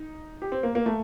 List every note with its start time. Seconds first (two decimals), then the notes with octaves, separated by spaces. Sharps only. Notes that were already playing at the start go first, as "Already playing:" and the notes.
Already playing: D#4
0.42 G4
0.52 C4
0.63 A#3
0.75 A#3
0.86 A3